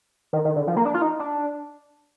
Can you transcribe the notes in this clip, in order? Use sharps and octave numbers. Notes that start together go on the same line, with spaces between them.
D#3
D#3
D3
F3
A#3
D4
F4
D#4
D4